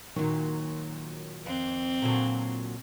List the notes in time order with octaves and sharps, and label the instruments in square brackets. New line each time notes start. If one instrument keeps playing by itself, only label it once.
[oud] A#2 F#3 [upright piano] D#3
[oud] F2 [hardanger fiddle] C4
[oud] A#2 D3 F#3